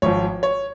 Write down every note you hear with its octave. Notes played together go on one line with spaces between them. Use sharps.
G#1 G#2 F3 C#5
C#5